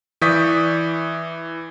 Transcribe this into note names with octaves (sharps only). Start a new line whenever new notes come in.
E3 D5 C#6 D#6 G6 B6